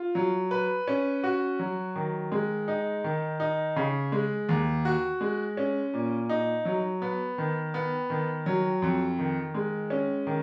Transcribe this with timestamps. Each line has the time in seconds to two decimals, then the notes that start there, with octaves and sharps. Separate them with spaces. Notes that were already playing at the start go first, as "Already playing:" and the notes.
Already playing: F4
0.15 F#3
0.51 B4
0.88 C#4
1.24 F#4
1.59 F#3
1.96 D#3
2.32 G#3
2.68 D#4
3.04 D#3
3.40 D#4
3.76 C#3
4.12 G#3
4.49 D#2
4.85 F#4
5.21 G#3
5.57 C#4
5.94 A#2
6.29 D#4
6.65 F#3
7.02 B3
7.38 D#3
7.74 B3
8.10 D#3
8.46 F#3
8.82 F2
9.19 D#3
9.54 G#3
9.90 C#4
10.27 D#3